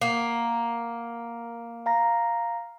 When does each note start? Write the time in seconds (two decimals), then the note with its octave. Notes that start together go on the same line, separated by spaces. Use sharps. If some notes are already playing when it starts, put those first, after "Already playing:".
0.01 A#3 F#5
1.86 F5 A#5 A#6